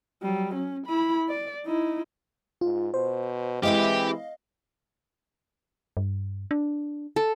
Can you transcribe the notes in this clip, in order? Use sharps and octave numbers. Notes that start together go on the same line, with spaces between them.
F#3 G3
C#4
E4 B5
D5
D#4 E4
G#2 F4
B2 C5
E3 G#3 C4 E4 G4 D#5 F5
G2
D4
A4